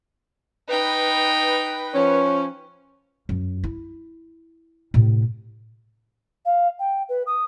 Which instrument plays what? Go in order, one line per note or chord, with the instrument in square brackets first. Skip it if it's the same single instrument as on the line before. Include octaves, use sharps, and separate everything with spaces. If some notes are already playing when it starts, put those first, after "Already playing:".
[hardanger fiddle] D#4 G5 [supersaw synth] B4
[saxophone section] F3 C#4 [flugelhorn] C#5
[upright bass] F#2
E4
A2 C3
[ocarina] F5
G5
B4
D#6